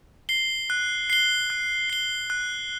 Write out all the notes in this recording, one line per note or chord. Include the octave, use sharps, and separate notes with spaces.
C7 G7
F#6
C7 G7
F#6
C7 G7
F#6